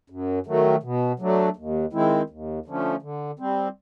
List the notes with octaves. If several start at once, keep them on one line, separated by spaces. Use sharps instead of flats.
F#2
D#3 F#3 A3
B2
F#3 A3 D4
D#2
D#3 G#3 C4 E4
D#2
D3 F3 A3 C#4
D3
G3 C4